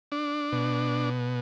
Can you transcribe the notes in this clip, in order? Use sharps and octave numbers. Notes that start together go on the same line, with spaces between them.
D4
B2